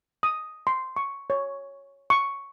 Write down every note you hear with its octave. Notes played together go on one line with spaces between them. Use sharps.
D#6
C6
C#6
C#5
C#6